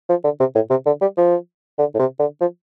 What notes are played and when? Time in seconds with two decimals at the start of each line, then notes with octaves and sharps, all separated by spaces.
0.10 F3
0.24 D3
0.40 C3
0.55 A2
0.70 C3
0.86 D3
1.01 G3
1.17 F3
1.79 D3
1.94 A2
1.99 C3
2.20 D3
2.41 F3